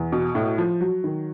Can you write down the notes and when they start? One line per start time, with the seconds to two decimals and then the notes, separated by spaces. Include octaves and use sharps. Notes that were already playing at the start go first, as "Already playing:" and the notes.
Already playing: E2
0.12 B2
0.35 A2
0.58 F3
0.81 F#3
1.04 D#3